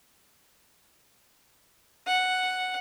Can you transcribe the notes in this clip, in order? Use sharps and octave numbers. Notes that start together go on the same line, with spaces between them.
F#5